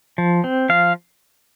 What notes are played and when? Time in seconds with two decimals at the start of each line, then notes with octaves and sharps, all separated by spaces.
0.18 F3
0.44 C4
0.69 F3 F5